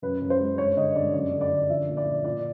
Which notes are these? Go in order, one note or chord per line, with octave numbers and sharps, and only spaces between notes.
F#2 B4
F#2
C5
G#3
G2 C#5
D3 D#5
G2 D5
F#2 D5
D3
D5
D3
F3 E5
A#2
D5
A#2
A#2 D5